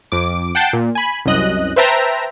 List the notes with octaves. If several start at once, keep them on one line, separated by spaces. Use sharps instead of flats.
F2 D6
F#5 G5 A5 C7
A#2
G#5 B5
C2 F#2 D#5 F#6
B4 C5 E5 G5 A5 A#5